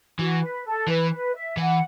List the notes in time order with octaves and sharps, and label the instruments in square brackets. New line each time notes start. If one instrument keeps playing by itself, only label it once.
[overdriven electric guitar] E3 [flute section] F#4
[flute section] B4
A4
[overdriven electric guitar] E3 [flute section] B4
[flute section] B4
E5
[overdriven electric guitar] E3 [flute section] F#5